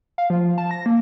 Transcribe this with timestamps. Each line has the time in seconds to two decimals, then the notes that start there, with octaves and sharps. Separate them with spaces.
0.18 F5
0.30 F3
0.58 A5
0.71 A#6
0.86 A#3